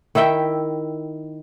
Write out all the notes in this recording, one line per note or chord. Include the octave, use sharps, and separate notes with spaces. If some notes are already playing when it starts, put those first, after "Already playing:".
D#3 E4 E5 G5